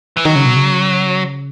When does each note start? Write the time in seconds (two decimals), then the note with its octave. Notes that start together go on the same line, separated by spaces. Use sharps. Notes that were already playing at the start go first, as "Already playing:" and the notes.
0.17 E3
0.25 D#3 F#3
0.36 C#3
0.46 B2
0.56 C#3